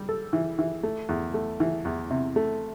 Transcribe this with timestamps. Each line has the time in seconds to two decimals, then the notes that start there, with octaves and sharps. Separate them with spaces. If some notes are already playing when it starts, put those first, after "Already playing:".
Already playing: G3
0.09 A4
0.33 E3
0.59 E3
0.83 A3
1.09 E2
1.34 A3
1.60 E3
1.85 E2
2.11 C3
2.36 A3